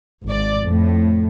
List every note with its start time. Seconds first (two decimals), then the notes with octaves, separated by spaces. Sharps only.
0.25 G#1 D5
0.63 F2 A2